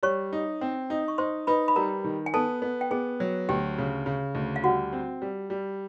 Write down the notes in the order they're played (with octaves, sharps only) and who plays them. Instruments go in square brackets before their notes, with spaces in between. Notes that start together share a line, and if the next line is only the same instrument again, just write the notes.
[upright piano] G3 [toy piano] C#5 C#6
[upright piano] D#4
C4
D#4
[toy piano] C#6
[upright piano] D#4 [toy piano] C5 C6
[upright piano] D#4 [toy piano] B4 B5
[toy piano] B5
[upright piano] G3 [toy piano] A#4 A#5
[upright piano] D#3
[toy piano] G#5
[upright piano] B3 [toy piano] A4 A5
[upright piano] B3
[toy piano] G5
[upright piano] B3 [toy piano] G#4 G#5
[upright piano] F#3
[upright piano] D2 [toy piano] G4 G5
[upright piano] C#3
C#3
D2
[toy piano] F5
[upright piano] G3 [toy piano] F#4 F#5
[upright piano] C4
G3
G3